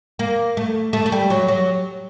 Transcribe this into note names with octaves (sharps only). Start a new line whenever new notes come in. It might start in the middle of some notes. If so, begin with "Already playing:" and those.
A#3
A3
A3
A3
G3
F#3
F#3